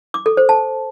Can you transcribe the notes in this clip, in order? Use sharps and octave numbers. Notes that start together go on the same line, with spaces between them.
D6
A4
C5
A5